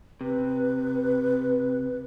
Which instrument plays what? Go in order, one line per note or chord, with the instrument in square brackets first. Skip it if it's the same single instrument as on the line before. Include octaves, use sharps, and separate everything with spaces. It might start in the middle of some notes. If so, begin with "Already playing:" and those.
[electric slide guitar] C3 [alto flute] B4